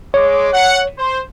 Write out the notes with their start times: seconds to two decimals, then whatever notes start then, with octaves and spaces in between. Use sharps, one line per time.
0.14 G#3 C#5 D6
0.52 F#5
0.98 C5